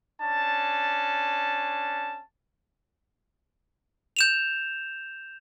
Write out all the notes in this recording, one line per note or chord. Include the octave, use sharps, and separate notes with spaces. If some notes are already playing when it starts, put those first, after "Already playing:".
C#4 D4 A5
G6 E7 F7